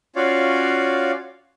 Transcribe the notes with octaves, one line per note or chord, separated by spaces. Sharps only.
C#4 F4 F#4 C#5 D5 F5